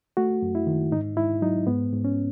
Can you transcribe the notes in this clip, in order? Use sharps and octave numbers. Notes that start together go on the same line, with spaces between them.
A3 F#4
F#2
E4
D#3
G#2 D#4
G#2 E4
F#3 D#4
G#2 B3
G#2
C#4